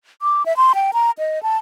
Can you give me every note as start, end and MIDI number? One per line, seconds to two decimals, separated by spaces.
0.22 0.45 86
0.46 0.55 76
0.57 0.73 84
0.75 0.91 79
0.93 1.11 82
1.19 1.42 75
1.43 1.57 81